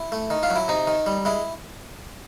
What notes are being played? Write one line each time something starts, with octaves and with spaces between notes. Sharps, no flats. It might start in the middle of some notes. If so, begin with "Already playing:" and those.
Already playing: E4
A3
D#3
F4
F#3
E4
C3 D#4
D#3
G3
G#3 E4